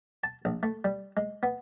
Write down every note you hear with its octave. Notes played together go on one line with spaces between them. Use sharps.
A5
A#1
A3
G3
G#3
B3